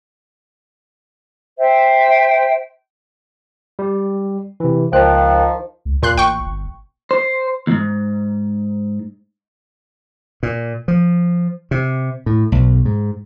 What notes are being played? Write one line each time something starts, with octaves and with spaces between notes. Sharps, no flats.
C5 E5 G5
G3
C3 E3
C#2 D#3 F3 G5 F#6
C#2
D#2 A#2 C6 F#6
A1 G5 C#6
G1
C5
D#2 G#2
A#2
F3
C3
A2
B1
G#2